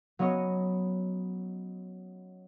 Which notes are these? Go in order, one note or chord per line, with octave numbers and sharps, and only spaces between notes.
F#3 B3 C#4 C#5 D#5